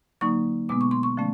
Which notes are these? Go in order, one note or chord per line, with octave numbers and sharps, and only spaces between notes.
D3 F#3 A#3 D#4 C#6
B2 G#3 B3 D6
C#6
C6
C#6
D3 F3 A3 C#4